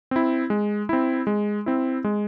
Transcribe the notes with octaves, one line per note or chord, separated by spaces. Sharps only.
C4 E4
G#3
C4 E4
G#3
C4 E4
G#3